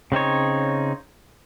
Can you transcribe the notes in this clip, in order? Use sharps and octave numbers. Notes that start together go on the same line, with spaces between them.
C#3 C4 D#4 C#5